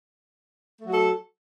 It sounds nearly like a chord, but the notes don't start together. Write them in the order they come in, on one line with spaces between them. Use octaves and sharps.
A3 F#3 F#4 A4